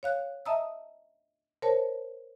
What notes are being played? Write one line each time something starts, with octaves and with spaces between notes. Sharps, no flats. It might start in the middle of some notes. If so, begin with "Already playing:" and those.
C#5 F5 F#6
D#5 E5 A5 A#5 D#6 E6
A#4 C5 C#5 A5